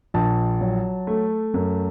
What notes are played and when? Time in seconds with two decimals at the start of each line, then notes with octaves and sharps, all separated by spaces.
0.14 A#1 A5
0.61 F#3
1.07 A3
1.54 F#2